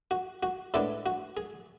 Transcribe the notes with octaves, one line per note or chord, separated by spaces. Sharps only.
F#4
F#4
A2 G#3 B3 D4 A4
F#4
G#4